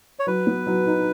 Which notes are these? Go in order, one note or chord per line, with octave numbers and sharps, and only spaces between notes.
C#5
F#3 B4
B3
F#3
D#4